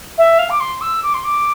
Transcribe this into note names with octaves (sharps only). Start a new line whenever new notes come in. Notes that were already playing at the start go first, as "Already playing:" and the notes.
E5
F5
D6
C6
E6
D6
C6
D6